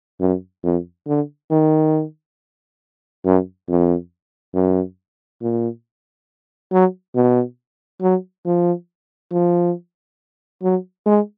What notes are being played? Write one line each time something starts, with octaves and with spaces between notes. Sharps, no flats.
F#2
F2
D3
D#3
F#2
F2
F#2
A#2
F#3
B2
F#3
F3
F3
F#3
G#3